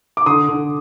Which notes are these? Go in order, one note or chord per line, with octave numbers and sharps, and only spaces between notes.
D6
D3 C6 D#6
D3